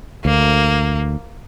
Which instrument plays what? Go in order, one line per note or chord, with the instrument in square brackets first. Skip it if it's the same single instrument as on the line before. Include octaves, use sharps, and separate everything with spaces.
[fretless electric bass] D2 [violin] A#3